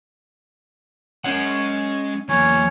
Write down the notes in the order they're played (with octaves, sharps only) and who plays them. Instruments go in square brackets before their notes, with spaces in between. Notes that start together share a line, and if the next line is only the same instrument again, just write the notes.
[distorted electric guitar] G#3 [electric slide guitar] C#4 C#5 F#5
[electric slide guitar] E2 [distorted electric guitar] F#3 A#3 [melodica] C#4 C#5